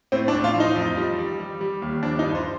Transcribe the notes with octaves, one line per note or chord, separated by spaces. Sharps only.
A2 C4
D4
A2
F4
F3
D#4
F2
G3
G3
G3
G3
D#2
F3 D4
D#4
G2
C5